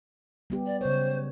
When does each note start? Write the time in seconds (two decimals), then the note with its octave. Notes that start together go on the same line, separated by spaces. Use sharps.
0.50 G3 B3 G4
0.66 D5
0.81 C#3 F#3 C5 C#5